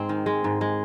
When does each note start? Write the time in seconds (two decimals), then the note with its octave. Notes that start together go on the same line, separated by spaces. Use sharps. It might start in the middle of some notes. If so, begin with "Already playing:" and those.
Already playing: G#2 G#3 C4
0.09 D#3
0.26 G#3
0.44 G#2
0.61 G#3